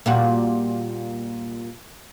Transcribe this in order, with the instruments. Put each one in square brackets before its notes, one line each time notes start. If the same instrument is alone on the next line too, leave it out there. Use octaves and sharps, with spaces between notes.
[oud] A#2 G3 F#4